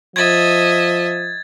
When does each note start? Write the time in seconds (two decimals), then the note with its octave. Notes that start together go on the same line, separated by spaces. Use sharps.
0.16 F3 D#5 E5 G#6 A6